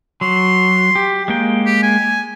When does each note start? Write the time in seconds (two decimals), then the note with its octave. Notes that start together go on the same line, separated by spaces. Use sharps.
0.21 F#3 C6
0.95 G4
1.28 G#3 A#3 G5
1.66 G4
1.83 G#5